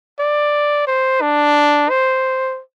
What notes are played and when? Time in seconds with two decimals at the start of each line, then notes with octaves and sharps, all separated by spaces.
0.20 D5
0.87 C5
1.22 D4
1.90 C5